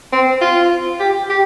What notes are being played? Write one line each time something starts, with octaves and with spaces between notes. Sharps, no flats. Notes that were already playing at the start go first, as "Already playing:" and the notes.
C4
F4
G4
G4